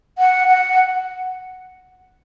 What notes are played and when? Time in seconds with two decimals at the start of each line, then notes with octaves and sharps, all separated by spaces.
0.18 F#5
0.48 F#5